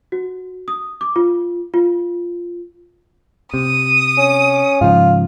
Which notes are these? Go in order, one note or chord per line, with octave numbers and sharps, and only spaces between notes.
F#4
D#6
D6
F4
F4
C3 D#6
C#4
G#2 C#3 F3 F4